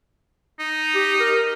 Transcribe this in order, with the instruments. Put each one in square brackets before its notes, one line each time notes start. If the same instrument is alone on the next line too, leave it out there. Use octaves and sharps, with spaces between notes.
[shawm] D#4
[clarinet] G4
A#4